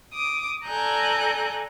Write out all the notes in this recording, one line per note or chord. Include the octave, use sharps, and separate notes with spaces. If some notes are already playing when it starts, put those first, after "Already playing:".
D6 D#6
A4 D5 G#5 A#5 F#6 G6